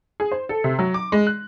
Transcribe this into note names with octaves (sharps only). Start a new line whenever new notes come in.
G#4
C5
A4
C3
F#3
D6
G#3
F#6